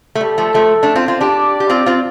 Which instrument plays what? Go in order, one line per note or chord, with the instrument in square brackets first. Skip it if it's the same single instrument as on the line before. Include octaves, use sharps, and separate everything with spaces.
[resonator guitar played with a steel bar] A3
[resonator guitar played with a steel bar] G3 [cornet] A4
[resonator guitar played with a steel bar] F3 A3
F3 A3
A3 D4
C4 F4
C4 F4
[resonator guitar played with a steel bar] D4 G4 [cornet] D5
[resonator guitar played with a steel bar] G4
C4 F4
C4 F4